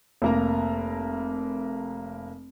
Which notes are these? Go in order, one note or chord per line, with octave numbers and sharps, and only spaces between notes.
F1 A#3 A#5